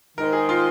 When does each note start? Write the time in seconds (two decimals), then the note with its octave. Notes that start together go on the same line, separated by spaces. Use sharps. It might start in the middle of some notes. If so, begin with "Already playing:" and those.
0.17 D#3 G#3 D#4 A#4 C5
0.32 G#4
0.49 F4